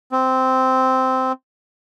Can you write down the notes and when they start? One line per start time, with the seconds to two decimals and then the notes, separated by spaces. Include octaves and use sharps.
0.12 C4